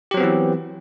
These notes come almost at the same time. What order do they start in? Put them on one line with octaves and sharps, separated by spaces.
G4 F#3 C4 B3 E3